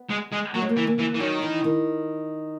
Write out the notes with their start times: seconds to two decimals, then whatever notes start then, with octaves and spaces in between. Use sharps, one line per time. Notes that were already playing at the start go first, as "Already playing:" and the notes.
Already playing: B3
0.10 G#3
0.32 G#3
0.54 F#3 A#3
0.62 G#3
0.69 A#3
0.77 E3
0.87 A#3
0.99 E3
1.15 E3
1.20 D#3 F#3
1.42 E3
1.64 D#3